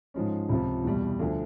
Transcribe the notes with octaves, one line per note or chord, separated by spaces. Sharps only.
G#2 F3 G#3 C#4
C#2 C3 F3
E2 B2 G3
D2 D3 F3